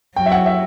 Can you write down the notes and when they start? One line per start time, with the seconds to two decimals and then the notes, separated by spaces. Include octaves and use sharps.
0.16 F#3 G5
0.26 E5
0.32 F#5
0.46 E5